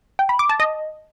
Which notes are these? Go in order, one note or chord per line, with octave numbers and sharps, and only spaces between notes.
G5
B5
D6
A5
D#5